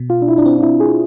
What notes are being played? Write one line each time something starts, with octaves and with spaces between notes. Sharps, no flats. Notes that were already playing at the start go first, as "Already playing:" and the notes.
Already playing: B2
F4
D4
E4
D4
C4
D4
E4
G#4